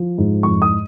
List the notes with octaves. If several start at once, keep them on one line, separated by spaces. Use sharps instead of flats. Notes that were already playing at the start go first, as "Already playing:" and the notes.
Already playing: F3
G#2
F2 C#6
D#6